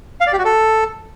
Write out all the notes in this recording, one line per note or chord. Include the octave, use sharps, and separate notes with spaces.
F5
D5
G4
F#4
A4